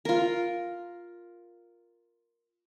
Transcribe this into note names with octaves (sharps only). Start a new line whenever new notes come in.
F4 A#4